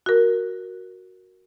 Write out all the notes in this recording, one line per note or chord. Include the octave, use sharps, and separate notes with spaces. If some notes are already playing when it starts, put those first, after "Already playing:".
F#4 A#4